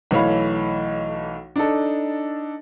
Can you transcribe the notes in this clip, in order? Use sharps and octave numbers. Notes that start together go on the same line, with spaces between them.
B1 E3 A3 C#5 F5 B5
D4 D#4 A4